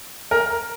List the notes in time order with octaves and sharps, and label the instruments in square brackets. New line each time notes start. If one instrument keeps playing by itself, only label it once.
[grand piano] A#4